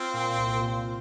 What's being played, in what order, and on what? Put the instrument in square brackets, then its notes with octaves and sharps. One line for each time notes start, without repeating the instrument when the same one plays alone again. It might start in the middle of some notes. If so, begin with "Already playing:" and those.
Already playing: [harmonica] C4 [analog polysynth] F4
[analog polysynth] A#2
C2
A#2